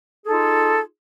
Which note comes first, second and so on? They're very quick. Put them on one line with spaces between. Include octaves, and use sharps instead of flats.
G#4 A4 D#4 F4